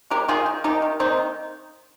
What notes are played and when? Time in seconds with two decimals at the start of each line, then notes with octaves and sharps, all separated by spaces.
0.10 G#3 G4 A#4
0.28 D#3 F4 G#4
0.46 D#3
0.64 D#3 D#4 G4
0.82 D#3
1.00 A#3 C4 D#4
1.17 D#3